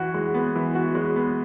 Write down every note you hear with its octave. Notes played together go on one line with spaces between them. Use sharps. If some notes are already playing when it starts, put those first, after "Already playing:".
Already playing: E3 F#4
G#3
B3
E3
F#4
G#3
B3